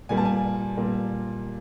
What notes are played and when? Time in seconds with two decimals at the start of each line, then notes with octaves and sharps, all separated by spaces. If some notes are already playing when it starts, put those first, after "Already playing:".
0.09 A#2 G3 A#3 G#5
0.17 A5
0.25 G#5
0.77 A#2 G3 A#3